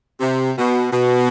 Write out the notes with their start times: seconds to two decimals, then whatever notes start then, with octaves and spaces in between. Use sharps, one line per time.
0.20 C3
0.56 B2
0.91 B2